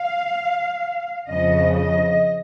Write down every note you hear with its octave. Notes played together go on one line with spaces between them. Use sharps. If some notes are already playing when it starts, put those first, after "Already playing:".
Already playing: F5
F2 C#3 F3 D#5
D#5